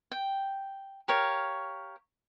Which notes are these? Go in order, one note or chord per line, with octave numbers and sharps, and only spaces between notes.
G5
G4 A#4 C#5 F5